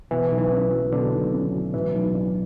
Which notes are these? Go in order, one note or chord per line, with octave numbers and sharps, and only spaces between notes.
B2 E3
B1
E3
C#4
F#3
B2 D3
B1
C#4
F#3
A2 E3
B1
D4